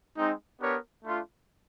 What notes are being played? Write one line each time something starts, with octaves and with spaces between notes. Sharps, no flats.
G#3 C4 D#4
B3 D4 G4 A#4 C#5
A3 D4 F4